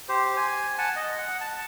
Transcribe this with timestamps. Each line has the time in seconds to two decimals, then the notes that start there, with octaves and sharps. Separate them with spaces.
0.09 G4 C5
0.37 G#5
0.78 F#5 G#5 A5
0.96 D#5
1.18 F#5
1.41 A5